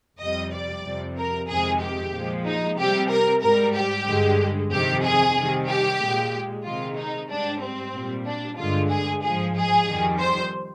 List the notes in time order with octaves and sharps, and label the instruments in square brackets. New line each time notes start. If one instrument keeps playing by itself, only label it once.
[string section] F2 C3 G3 D#5
D5
F2 C3 G3
A#4
F2 C3 D#3 G#3 G#4
G4
A#2 F3 G#3
D#4
C3 G3 G4
A#4
G#2 G3 A#4
G4
G2 D3 G#3
F2 C3 D#3 G4
G#4
C3 D#3 G3
G4
A#2 G#3
C3 D#3 G#3 F4
D#4
G#2 G3 D4
C4
A#2 G3
D4
G2 D3 G#3 F4
G#4
G#2 F3 G#3 G#4
G#4
F2 D#3 G3
C5